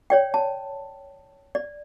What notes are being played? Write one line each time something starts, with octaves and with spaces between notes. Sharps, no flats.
C#5 D5 G5
A5
D5